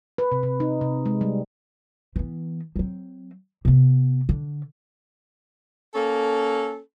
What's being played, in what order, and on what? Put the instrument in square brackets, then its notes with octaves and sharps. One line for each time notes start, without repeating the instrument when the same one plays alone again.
[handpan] B4
C3
C3
D#4
C3
G#3
G3
[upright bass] E3 B3
F#3 C4
C3 B3
D3
[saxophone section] A#3 C#4 A4